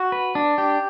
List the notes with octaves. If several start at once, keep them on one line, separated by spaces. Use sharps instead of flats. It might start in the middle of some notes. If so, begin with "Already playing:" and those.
Already playing: F#4
B4
D4
G4